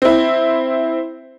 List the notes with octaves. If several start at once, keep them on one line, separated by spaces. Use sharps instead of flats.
C4 E4